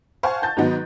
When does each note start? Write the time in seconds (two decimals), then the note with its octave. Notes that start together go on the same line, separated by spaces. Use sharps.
0.23 C5 F5 F#5 G#5 A5 C#6
0.42 A5 G6 A6
0.57 G#2 D#3 F#3 B3 D#4 F#4